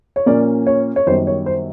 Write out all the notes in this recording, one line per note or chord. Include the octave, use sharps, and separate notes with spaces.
C#5
A#2 F3 A#3 C#4 D5
C#5
C#5
F#2 D#3 G3 B3 C5
C#5
C5